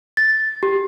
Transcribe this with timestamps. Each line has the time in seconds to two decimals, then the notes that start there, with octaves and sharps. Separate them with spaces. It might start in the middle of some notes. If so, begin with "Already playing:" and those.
0.17 A6
0.63 G4